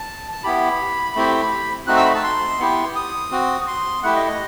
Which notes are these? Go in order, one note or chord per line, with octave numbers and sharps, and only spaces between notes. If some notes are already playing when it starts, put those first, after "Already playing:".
Already playing: A5
A5
B3 E4 G4 B5
A3 C4 E4 G4
A3 C4 D#4 F#4 F#6
E6
B5
A5
C6
B3 E4 G4
D#6
C4 F#4
C6
A3 E4 G4 F#5
D#5
D#5